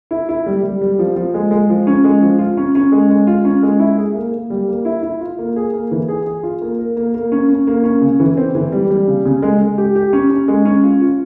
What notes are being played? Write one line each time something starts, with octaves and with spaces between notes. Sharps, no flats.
E4
E4
G3
G3
G3
F3
F3
G#3
G#3
F3
C#4
G#3
F3
F4
C#4
C#4
G#3
G#3
F4
C#4
G#3
E4
G#4
A#3
A#3
G3
A#3
E4
E4
F4
A#3
G#4
A#3
E3
G#4
G#4
F4
A#3
A#4
A#3
A#3
C#4
C#4
A#3
C#4
C#3
E3
C4
E3
G3
G3
C#3
C#3
G#3
G#3
G4
G4
C#4
C#4
G#3
C#4
F4
F4